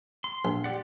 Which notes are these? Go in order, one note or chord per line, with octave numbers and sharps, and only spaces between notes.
C6
A#1
G4 D5 F#5